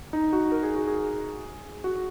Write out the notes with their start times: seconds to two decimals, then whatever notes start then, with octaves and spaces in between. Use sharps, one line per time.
0.13 D#4
0.33 F#4
0.52 A#4
0.63 G#4
0.76 F#4
0.87 G#4
1.84 F#4